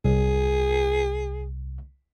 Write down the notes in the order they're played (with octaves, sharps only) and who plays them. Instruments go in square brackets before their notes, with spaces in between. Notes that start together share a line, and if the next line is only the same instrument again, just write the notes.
[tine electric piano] C2 [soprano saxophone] G#4